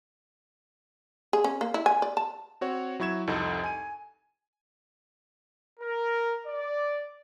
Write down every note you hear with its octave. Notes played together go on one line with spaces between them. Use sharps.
G#4
C#4
A#3
E4
G#5
D5
A5
C4 F#4 C#5
F#3 E4 C#6 G#6 E7
C2 F2 D#4 A4
G#5 D#7
A#4
D5